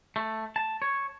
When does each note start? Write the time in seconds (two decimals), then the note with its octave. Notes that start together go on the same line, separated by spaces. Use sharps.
0.16 A3
0.56 A5
0.82 C#5